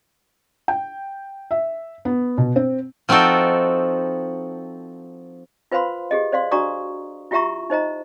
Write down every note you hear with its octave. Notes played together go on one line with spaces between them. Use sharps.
G5
E5
B3
B2
C4
F3 C4 D#4 F#4 A4 G5
F4 B4 C5 F5 B5 C6
G4 G#4 D#5
C5 D5 F5 C6
D4 F#4 D5 A#5 C#6 D#6
E4 F4 G4 E5 A#5 C#6
D#4 C5 D#5 A#5